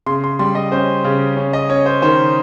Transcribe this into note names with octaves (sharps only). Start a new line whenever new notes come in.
C#3 C6
C6
G3 C6
D#5
C#4 C5
C#3
C#4
D#5
C#4 C#5
C5
D#3 C5